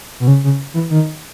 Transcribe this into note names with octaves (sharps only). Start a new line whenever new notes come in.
B2
C#3
C#3
E3
D#3